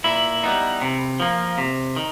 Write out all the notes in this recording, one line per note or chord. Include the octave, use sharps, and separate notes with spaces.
A#2 E4
G3 B3 D#4
C3
F3 A#3
C3
D#3